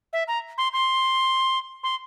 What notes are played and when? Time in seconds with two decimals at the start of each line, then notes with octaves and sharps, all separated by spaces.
0.13 E5
0.28 A#5
0.58 C6
0.73 C6
1.83 C6